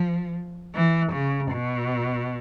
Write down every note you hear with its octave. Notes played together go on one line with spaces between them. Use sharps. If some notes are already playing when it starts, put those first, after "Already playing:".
Already playing: F3
E3
C#3
B2